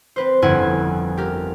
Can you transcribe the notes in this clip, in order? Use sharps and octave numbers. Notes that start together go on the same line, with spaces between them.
C4 B4 C5
G1 F2 C#4 E4 F#5 G#5
G4 A#4